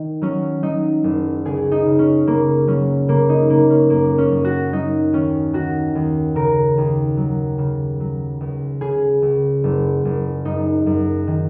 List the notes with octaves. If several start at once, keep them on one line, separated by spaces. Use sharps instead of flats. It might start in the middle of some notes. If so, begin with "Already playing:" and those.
Already playing: D#3
F#3 C#4
F#3 D#4
F#1
C#2 G#4
D#4
C#3
C#4
C#3 A#3
F#3 C#4
C#3 A#3
D#4
C#3 A#3
C#4
F#2 A#3
C#4
F#2
F#4
F#3 D#4
D#2 C#4
D#3 F#4
D#2
C#3 A#4
D#2
F#3
C#3
F#3
C#2
C#3 G#4
C#2
F#1
F#1
F#2 D#4
F#2
D#3